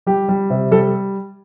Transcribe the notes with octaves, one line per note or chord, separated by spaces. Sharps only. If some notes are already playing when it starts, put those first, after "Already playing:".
G3 G4
G3
C3
G3 A4